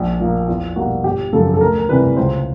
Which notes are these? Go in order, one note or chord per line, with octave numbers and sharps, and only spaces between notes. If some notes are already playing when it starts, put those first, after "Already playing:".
Already playing: A#1
A#2 F3 A#3
E2 F4
B2 G3 A#3 F#4
G1 G4
F#2 C#3 F3 A4
A4
D2 A#4
A#4
C3 E3 G3 B4
C#2 C5